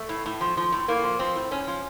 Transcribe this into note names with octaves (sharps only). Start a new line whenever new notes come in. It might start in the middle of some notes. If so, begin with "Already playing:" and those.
Already playing: A3
A2
A2
F3
F3
A2
A2 A#3
F3
F3 C4
A2
A2 C#4
F3